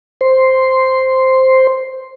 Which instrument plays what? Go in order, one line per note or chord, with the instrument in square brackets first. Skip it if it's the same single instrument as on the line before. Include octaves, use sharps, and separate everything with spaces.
[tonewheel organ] C5 C6